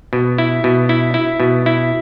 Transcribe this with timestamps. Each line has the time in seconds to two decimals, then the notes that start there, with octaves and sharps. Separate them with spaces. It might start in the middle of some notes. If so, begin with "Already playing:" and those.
0.13 B2
0.38 E4
0.64 B2
0.89 E4
1.14 E4
1.40 B2
1.66 E4